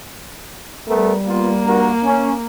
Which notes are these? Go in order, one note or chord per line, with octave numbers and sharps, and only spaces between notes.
G3 A3 B3 A#4
A#3 B3 F4
G2 F#4 A#4
C#4